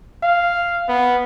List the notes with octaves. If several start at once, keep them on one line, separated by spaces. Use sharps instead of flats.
F5
B3